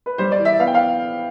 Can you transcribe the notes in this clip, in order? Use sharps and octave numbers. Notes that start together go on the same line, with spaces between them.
B4
G3 C5
D5
E3
E5
B3 F5
G5
F5